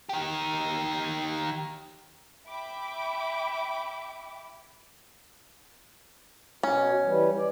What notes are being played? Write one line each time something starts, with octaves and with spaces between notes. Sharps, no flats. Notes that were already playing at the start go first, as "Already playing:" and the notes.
D#3 G4
E5 G5 B5 D6
B2 C#4
E3 G3
D5